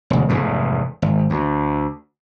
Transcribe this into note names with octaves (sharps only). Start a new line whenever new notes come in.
E1 D2
F1 E2 G#2
G#1
D2